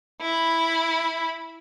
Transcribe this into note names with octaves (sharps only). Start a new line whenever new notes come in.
E4 B5